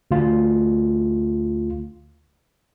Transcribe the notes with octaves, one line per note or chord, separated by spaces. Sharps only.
D2 F4